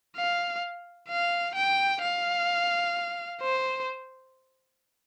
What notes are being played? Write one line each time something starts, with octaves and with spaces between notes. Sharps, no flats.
F5
F5
G5
F5
C5